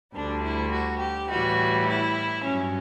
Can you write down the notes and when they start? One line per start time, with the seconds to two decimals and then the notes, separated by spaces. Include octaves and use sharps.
0.14 D2 D3 G3 D4
0.43 E4
0.72 F#4
0.99 G4
1.28 A2 E3 G3 F#4
1.87 E4
2.44 G2 F#3 C#4